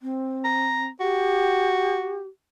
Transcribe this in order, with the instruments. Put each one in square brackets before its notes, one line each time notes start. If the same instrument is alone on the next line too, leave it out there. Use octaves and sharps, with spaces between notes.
[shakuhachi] C4
[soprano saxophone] A#5
[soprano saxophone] F#4 [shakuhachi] G4